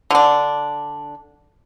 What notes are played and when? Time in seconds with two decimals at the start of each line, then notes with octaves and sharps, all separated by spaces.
0.11 D3 D4